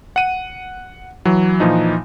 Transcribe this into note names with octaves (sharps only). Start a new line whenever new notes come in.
F#5 D#7
E3 F#3
A#2 E3 F3 D#4